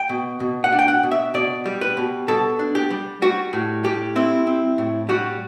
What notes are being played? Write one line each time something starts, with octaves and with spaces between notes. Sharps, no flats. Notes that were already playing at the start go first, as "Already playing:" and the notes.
Already playing: G5
B2
B2
F#5
D4
G5
F#5
B2
E5
B2 D5
G3
B4
B2
B2 A4
D4
G4
G3
G3 F#4
A2
G3 G4
C4 E4
C4
A2
G3 F#4